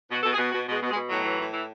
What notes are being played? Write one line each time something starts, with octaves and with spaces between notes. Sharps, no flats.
B2 F#4
B2 A4
G#4
B2
B2 F#4
B2 G#3
B2
G#3
B2
A2 F#3
E3
A2
E3